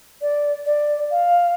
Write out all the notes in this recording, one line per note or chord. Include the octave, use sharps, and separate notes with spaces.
D5
D5
F5